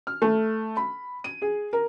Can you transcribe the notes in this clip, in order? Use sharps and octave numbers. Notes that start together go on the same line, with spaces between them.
F6
A3
B5
D#7
G#4
A#4